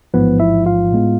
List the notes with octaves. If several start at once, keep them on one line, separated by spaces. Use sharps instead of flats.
A1 G#2 F3 B3 B4
E4 E5
F4 F5
A2 G#3 B3